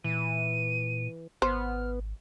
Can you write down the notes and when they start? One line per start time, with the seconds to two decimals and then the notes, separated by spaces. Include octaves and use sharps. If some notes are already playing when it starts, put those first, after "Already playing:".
0.04 A#2 E3 D#7
1.42 G#1 B3 C5 F6